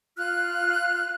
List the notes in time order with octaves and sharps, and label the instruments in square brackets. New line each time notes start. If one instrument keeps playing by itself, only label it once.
[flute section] F4 F6 F#6